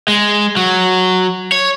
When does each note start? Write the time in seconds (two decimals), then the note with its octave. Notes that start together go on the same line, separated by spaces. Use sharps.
0.08 G#3
0.57 F#3
1.52 C#5